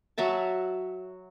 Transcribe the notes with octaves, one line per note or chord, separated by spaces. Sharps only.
F#3 F#4 E5 A5